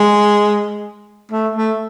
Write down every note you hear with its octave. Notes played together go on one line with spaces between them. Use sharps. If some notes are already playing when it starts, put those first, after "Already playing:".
Already playing: G#3
A3
A3